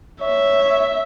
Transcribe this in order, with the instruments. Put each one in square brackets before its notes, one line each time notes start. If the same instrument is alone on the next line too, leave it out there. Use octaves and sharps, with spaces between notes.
[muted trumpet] C#5 [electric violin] E5